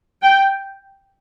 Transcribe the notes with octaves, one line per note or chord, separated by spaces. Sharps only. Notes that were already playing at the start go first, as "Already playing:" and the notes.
G5